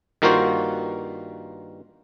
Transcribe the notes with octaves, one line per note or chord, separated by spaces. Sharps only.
G2 D#3 A#3 F4 F#4 C5